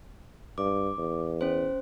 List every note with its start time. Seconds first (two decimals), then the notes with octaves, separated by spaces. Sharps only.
0.58 G2 D6
0.98 E2
1.41 C#4 C5